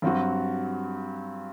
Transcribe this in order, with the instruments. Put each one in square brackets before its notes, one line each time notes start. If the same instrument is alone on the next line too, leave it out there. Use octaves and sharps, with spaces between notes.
[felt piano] G2 F#3 C4 F#4